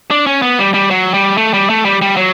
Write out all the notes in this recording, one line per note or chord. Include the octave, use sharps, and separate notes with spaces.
D4
C#4
B3
G3
G3
F#3
G3
A3
G3
A3
G3
G3
F#3